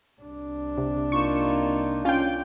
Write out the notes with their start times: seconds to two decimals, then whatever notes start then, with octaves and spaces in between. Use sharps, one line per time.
0.21 C2 D4
0.78 C3
1.12 A#3 D#4 F4 C#6 E7
2.05 C#4 F4 G5